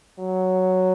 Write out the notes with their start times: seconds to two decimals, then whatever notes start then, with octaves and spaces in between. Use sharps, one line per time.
0.19 F#3